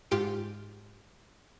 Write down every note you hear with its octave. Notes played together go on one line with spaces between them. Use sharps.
G#2 F4 G4 D7